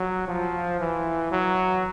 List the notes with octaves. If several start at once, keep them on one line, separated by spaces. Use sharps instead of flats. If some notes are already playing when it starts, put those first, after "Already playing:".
Already playing: F#3
F3
E3
F#3